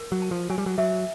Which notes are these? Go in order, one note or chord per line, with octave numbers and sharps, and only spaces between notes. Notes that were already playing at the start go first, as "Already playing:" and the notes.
Already playing: A#4
F#3
A5
F3
F#3 G#5
G3
F#3
F#3 E5